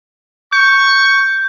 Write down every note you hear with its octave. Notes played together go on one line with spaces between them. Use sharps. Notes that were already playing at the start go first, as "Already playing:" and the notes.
C#6 G6